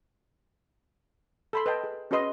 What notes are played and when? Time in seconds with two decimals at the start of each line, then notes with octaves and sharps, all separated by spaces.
1.53 A4 B5 C6
1.66 B4 D#5 G5 A5
1.84 G#4
2.11 C#4 F#4 G#4 B4 D#5 C6